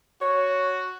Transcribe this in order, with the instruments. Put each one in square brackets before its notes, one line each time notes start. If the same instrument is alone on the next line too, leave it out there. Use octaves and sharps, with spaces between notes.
[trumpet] F#4 [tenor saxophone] C#5